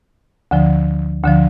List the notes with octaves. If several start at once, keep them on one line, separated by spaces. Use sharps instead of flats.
D2 D3 F3
D2 D3 F3